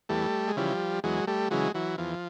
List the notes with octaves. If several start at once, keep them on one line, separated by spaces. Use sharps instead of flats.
E2 G3 A3
G#3
C#3 E3 F3 G3
E2 F#3 G#3
G3 A3
C#3 E3 F#3 G#3
E3 F#3
E2 F3